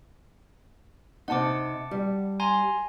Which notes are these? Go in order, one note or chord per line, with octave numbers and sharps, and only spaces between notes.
C3 D#4 F#5 A5 D6
G3
G#5 A#5 C6